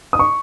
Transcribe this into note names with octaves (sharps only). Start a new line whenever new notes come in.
D#6
C#6